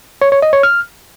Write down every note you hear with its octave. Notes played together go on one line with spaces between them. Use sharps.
C#5
C#5
D#5
C#5
F6